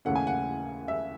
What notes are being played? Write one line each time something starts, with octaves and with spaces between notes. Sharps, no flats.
D#2 C#3 E3 A3 C#4 F#5
G#5
F#5
E5